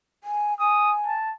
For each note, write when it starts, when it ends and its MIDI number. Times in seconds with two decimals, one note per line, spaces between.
0.24 0.59 80
0.59 1.13 80
0.59 0.92 87
1.06 1.33 81